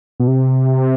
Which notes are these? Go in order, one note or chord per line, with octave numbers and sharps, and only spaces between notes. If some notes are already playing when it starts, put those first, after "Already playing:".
B2
C3